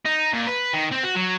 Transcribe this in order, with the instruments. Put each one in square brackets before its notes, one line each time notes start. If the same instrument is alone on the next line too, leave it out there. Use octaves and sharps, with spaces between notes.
[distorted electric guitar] D#4
A#2
B4
D#3
C4
F#4
F#3